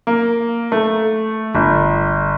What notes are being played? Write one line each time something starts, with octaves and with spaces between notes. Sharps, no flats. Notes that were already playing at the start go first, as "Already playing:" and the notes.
A#3
A3
G1